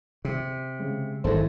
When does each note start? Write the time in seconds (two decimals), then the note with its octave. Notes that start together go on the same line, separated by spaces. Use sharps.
0.25 C3
0.80 C#3 G#3
1.24 G#1 F#2 E4 A4 C5